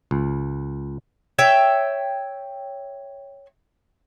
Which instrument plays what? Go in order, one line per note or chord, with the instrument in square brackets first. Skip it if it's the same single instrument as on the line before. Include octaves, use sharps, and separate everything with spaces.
[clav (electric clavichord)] C#2
[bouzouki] C#5 E5 G5